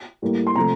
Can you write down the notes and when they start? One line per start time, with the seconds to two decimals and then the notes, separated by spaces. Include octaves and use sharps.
0.22 A2 G3 A#3
0.47 C6
0.56 C3 F3 A3 A#5